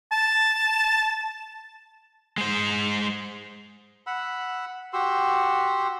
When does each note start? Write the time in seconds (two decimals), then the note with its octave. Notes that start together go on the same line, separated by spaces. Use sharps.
0.12 A5
2.38 G#3 C5
4.07 F#5 B5 E6
4.93 F#4 G4 C6 E6